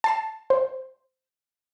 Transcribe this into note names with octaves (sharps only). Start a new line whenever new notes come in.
A5 C7 E7
C5